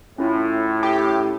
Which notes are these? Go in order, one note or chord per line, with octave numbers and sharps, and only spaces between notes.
A2 C#4 E4 F4
G4